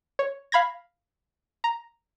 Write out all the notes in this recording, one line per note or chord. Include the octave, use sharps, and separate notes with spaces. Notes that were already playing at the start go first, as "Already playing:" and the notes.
C#5
F5 B5 G#6 A#6
A#5